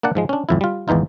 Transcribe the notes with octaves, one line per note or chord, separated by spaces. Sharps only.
A#3 D4 D5 F#5
G#2 F3 G#3
C#4 D4
G#1 F2 E4
G3 F4
G#1 E2 E3 D#4 F4